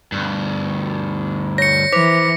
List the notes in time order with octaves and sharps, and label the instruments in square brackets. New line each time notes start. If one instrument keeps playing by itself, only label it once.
[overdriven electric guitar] D2 G2
[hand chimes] C#5 [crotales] A#6 C#7
[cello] E3 [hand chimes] C5 D6 B6